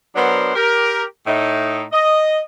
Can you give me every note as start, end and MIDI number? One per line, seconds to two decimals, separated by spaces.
0.16 0.52 54
0.16 0.52 59
0.16 0.52 62
0.16 0.52 70
0.16 0.52 72
0.55 1.03 67
0.55 1.03 70
1.26 1.84 45
1.26 1.84 63
1.92 2.40 75